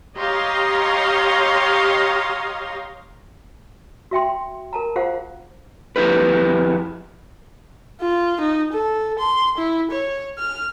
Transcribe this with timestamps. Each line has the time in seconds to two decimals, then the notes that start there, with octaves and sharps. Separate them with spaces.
0.18 G4 C#5 D#5 F5 A#5 C6
4.11 F#4 E5 G5 C6
4.73 A#4 A5 A#5
4.96 F4 G#4 C5 F5 F#5
5.96 F2 E4 G4 B4
8.01 F4
8.41 D#4
8.73 A4
9.19 C6
9.58 E4
9.91 C#5
10.38 F6